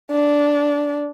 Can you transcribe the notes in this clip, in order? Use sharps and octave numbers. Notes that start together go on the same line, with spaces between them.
D4